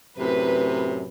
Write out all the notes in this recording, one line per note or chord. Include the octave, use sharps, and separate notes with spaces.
F#2 A2 C3 B4